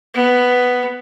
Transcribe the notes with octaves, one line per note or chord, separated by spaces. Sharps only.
B3